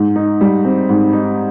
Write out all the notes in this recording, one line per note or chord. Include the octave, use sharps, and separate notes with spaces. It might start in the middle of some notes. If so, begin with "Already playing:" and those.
Already playing: G#2
D#4
G3
C4
G#2
D#4